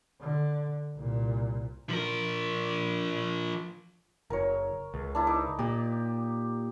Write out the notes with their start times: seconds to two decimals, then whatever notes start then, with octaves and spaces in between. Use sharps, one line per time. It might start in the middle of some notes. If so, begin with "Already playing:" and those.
0.21 D3
0.95 C2 A#2
1.89 F3 A#4
4.30 F#1 A#4 C#5
4.94 C#2
5.15 D4 E4
5.27 D#4 D6
5.59 A#2 G4